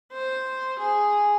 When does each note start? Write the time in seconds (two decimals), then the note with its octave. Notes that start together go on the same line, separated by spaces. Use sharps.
0.12 C5
0.79 G#4